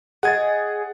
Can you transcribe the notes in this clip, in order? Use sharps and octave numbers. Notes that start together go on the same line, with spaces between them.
G#4 C#5 D#5 F#5 G5 G#6 A6